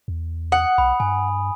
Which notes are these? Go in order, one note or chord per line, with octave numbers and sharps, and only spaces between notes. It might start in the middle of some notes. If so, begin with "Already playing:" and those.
E2
F#5 D#6
B1 B5
G2 G#5